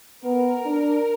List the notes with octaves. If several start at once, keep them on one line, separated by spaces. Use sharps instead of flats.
B3 A#4
D4